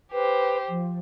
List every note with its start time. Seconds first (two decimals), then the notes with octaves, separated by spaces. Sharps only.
0.12 G4 B4 C5
0.68 F3